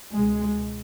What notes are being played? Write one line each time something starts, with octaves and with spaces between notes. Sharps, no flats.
C#2 B2 G#3